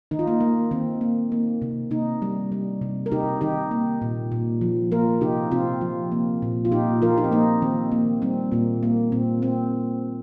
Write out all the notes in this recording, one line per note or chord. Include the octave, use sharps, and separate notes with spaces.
D#3 D#4
F4
A#3 D#4
A#3
D#3 C4
A#3
A#3
C3
C3 A#3 D#4
G3
G3
C3
A#4
C3 D#4 G4
D#3 D#4 G4
A#3
A#2
A#2
F3
A#3 F4 A#4
C3 D#4 G4
C3 C4 F4
F3
A#3
A#2
F4
A#2 D#4 G4
F3 F4 A#4
D#4 G4
C4
A#3 D#4
D#3 C4
D#3 A#3
G3 C4
A#2 A#3
A#3
A#2 C4
A#3 C4